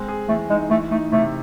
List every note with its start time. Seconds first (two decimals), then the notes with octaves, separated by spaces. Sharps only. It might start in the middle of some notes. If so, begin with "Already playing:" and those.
Already playing: G#3 C4
0.08 G#4
0.28 E3 A3
0.50 G#3 D#4
0.70 E3 A3
0.91 A3 D#4
1.11 C3 A3